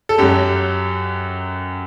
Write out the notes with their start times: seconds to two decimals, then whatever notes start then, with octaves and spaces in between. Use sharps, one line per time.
0.09 A4
0.18 F#2 F#3 G4